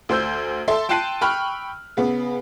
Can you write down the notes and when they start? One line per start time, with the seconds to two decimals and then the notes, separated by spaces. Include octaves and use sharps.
0.09 D2 C5 E6 G6
0.68 A4 E5 C6
0.89 G5 A5 C6 F#6 C7 D#7
1.21 G5 B5 C#6 F6 F#6
1.97 C#3 B3